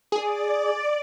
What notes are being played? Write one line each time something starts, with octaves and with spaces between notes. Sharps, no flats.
G#4 D5